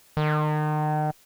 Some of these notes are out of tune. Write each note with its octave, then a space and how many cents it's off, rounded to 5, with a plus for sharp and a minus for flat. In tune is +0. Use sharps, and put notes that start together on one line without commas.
D#3 -35